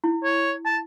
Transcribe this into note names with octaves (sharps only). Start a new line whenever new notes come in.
E4
C#5
A5